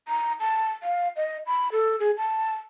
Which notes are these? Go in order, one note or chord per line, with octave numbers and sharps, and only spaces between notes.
A#5
A5
F5
D#5
B5
A4
G#4
A5